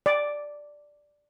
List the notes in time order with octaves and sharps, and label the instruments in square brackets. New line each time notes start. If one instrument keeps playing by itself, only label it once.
[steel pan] D5